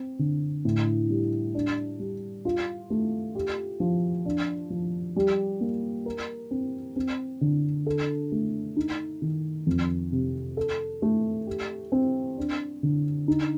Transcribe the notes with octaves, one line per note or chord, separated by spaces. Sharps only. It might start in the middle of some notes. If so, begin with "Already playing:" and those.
Already playing: C4
D3
A2
G3
D4
G3
F4
A3
G4
F3
D4
F3
G3
A#3
A#4
C4
C4
D3
A4
A3
D#4
D#3
F2
C3
A4
A3
G4
C4
D4
D3
D#4